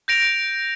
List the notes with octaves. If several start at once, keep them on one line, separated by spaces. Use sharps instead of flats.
G6 A#6 D7 F7